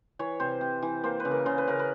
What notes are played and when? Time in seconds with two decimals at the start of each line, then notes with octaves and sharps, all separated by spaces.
0.19 E3 C#5
0.40 C3 C5
0.61 C3
0.82 E3
1.04 A#3 C5
1.20 B4
1.25 C#3
1.31 A#4
1.46 C#3 C5
1.58 B4
1.67 C#3 A#4
1.79 B4